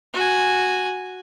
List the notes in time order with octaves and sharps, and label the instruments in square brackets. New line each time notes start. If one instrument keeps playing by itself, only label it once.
[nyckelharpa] F#4 G#5